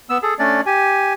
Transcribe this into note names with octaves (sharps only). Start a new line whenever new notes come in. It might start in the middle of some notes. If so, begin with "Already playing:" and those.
B3 E6
G#4 A4
A3 C#4 D4 D5
G4 G#5